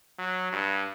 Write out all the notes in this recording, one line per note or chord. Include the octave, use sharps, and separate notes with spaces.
F#3
G2